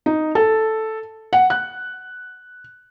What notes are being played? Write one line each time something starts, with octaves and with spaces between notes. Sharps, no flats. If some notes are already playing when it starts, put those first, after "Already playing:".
D#4
A4
F#5
F#6